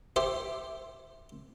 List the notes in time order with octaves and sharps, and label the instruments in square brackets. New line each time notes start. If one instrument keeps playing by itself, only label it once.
[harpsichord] G4 C5 E5